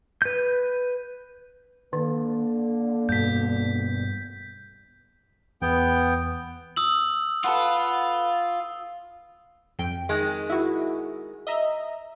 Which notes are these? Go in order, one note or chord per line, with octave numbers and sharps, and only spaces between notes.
B4 G6
D3 D#3 A#3
G2 B2 G6 B6
E2 B3 G5
D#6 E6 F#7
F4 A4 B4 F#5
F2 G5 D7
D#3 G#3
E4 F#4
D#5 E5 A#5